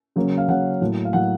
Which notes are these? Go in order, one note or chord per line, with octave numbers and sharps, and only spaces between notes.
C#3 F#3 A#3 C#4
F5
C#3 F#3 A#3 C#4 F#5
A2 F#3 A#3
F5
A2 F#3 A#3 F#5